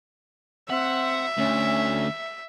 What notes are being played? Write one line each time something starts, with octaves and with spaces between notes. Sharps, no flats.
C4 E5 F#5
D2 C#4